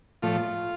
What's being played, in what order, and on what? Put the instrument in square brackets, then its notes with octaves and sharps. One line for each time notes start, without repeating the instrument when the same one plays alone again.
[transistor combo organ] A2 F3 A3 F4